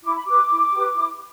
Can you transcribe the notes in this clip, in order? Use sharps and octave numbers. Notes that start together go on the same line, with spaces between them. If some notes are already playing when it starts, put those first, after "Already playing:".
E4 D6
B5
G4 B4 D6
E4
G4 B4
E4